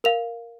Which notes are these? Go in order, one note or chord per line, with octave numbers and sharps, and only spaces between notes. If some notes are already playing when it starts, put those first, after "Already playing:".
A#4 F5 F7